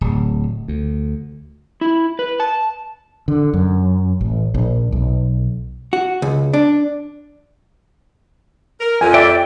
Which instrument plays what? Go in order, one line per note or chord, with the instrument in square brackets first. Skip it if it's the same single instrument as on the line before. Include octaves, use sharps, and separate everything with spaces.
[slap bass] D1
D2
[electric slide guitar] E4
B4
A5
[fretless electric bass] D3
F#2
A1
A#1
B1
[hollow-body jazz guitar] F#4
C#2
D4
[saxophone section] A#4
[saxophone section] F2 [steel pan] G#5
[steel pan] D5 E5 [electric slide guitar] G5